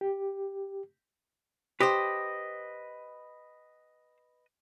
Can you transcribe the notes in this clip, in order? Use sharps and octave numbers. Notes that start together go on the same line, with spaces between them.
G4
G4 B4 C5 D#5